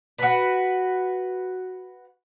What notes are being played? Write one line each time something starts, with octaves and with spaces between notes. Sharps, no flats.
F#4 B4